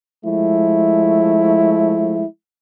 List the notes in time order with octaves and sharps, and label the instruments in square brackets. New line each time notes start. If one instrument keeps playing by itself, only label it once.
[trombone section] F3 G#3 A3 E4